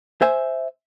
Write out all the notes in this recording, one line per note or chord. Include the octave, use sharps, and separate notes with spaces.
C5 E5 G#5